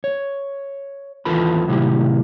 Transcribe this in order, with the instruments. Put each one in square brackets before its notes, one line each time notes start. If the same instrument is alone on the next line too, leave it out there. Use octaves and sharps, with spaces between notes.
[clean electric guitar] C#5
D#2 E3 F4 A4 B4 B5
A2 C3 D#3 F#3 E4 G4